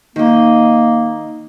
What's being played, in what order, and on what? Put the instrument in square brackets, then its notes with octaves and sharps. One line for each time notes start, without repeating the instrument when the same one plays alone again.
[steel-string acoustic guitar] D#3 D#5 [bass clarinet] A#3